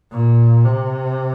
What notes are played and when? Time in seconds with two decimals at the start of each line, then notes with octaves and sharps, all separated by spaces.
0.12 A#2
0.65 C3